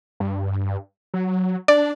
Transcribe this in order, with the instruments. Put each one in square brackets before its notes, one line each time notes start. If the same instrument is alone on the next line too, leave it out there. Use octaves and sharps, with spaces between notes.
[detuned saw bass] G2
F#3
[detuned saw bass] D4 [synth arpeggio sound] D5